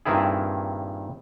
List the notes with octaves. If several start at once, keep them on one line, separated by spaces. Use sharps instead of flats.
G2 A#2 D#3 C4 E4 G#4